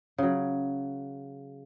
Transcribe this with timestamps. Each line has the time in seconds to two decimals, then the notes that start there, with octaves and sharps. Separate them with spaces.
0.18 C#3 F#3